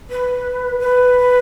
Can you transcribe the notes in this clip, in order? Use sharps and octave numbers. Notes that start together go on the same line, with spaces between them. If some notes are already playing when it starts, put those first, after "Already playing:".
B4
B4